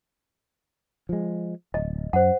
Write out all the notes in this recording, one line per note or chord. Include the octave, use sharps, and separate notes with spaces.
F3 G#3
D1 D#5
F#2 C5 F#5